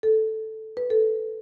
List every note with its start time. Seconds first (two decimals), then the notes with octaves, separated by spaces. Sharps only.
0.03 A4
0.77 B4
0.90 A4